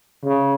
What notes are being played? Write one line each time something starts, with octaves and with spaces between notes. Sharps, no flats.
C#3